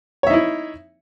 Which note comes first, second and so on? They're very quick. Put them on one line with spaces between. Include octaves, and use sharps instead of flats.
C#5 E5 D#4 E4